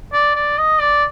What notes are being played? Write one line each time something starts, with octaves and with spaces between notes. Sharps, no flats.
D5
D5
D#5
D5